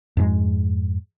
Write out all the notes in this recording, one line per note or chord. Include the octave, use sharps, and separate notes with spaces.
F2 G#2 G#3